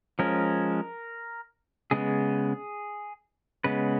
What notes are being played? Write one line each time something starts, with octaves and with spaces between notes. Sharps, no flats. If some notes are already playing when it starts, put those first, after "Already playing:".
F3 G#3 C#4 A#4
C#3 G#3 B3 G#4
C#3 G#3 B3 B4